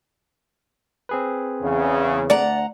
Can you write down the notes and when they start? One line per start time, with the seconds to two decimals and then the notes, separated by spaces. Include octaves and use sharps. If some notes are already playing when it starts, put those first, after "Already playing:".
1.09 C4 G#4 B4
1.63 E2 C#3
2.30 D2 D5 F#5 A#5